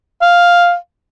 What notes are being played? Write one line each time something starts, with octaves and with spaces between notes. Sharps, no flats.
F5